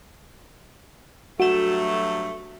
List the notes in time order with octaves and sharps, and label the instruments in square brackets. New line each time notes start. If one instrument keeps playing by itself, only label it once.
[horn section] G2 F#3 A3 [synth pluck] F#4 E7